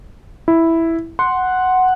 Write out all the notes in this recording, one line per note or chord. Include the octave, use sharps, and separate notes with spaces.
E4
F#5 C6